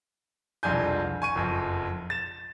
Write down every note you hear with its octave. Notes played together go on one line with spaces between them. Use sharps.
E1 C2 F2 D4 G#5 G6
G#5 C#6 D#7
F#1 F2
A6 E7